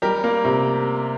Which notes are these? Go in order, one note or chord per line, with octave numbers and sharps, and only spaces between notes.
G3 G4 A#4
A#3
C3